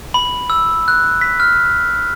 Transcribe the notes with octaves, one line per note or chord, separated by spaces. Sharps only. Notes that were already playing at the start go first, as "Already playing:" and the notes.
B5
E6
F#6
B6
F6